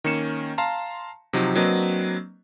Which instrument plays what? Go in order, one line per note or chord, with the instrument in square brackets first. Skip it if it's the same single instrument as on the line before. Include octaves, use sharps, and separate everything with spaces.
[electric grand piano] D#3 A#3 C#4 C#7 E7
F5 A5 A#5 C6
C3 F3 F#3 D#4
F#3 A#3 C4 D4 B4 D#5